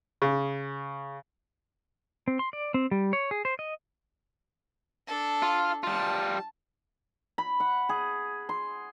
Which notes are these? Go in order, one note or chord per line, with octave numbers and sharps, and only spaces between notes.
C#3
C4
C6
D5
C4
G3
C#5
G#4
C5
D#5
D4 A4
F4
G3 F4 A5
B5
F#5
G#4
C6